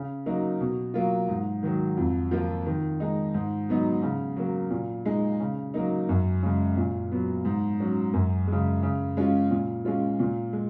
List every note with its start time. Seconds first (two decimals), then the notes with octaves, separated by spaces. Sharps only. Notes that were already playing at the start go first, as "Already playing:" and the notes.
Already playing: C#3
0.26 F#3 A#3 D#4
0.61 B2
0.94 F#3 A#3 F4
1.29 G#2
1.63 D#3 F#3
1.97 F2
2.31 F3 A#3 F4
2.66 D#3
3.00 G#3 D#4
3.34 G#2
3.69 F#3 B3 D#4
4.03 C#3
4.36 F#3 A#3
4.71 A#2
5.05 G#3 D#4
5.40 C#3
5.74 F#3 A#3 D#4
6.09 F#2
6.43 C#3 G#3
6.77 A#2
7.12 F#3 B3
7.45 G#2
7.80 F#3 C#4
8.13 F#2
8.47 G#3
8.52 C#3
8.83 C#3
9.17 G#3 C#4 F4
9.51 A#2
9.85 G#3 C#4 F4
10.19 A#2
10.53 G#3